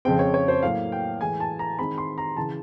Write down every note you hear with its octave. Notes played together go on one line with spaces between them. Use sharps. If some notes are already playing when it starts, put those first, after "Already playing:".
F2 C#3 F3 G#3 C4 G5
C#5
C#5
C5
A2 F#3 A#3 F5
G5
A2 E3 G#3 G#5
A5
A#5
D#3 G#3 C4 B5
C6
A#5
C#3 E3 A5